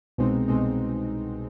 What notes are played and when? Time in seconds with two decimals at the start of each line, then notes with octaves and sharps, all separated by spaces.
0.18 C2 B2 G#3 C4 D#4
0.48 C2 B2 G#3 C4 D#4